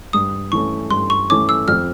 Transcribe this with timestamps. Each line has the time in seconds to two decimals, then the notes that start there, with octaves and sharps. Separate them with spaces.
0.13 G2 D#6
0.52 E3 A3 C#4 C#6
0.91 G2 C6
1.10 C#6
1.29 E3 A3 C#4 D6
1.49 E6
1.68 F2 F6